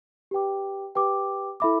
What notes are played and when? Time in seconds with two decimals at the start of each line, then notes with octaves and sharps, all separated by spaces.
0.31 G4 B4 G5 D6
0.95 G4 B4 G5 D6
1.60 E4 A4 E5 B5 D6